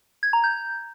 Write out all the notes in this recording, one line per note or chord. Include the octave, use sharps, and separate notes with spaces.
G#6
A#5
G6